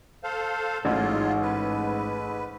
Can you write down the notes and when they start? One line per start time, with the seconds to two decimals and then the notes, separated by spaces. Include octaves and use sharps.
0.24 A4 C5 F5
0.85 A1 G#2 F#3 F4
1.42 B4